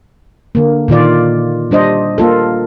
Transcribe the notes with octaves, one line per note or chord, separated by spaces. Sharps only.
D3 A#3
A#2 D#3 F4 D5
G3 D4 C5 D#5
A#3 F4 A4